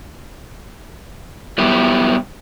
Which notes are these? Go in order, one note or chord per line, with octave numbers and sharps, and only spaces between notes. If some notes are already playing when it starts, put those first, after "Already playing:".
G2 F#3 B3 E4 G4